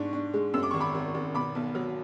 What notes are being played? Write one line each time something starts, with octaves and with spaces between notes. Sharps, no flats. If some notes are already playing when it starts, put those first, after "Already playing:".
Already playing: G#2 D4 C#6
D4
G#3
F#2 E6
D6
G#1 C#6
B5 D6
G#1
G#1
B2 B5 D6
B1
F#3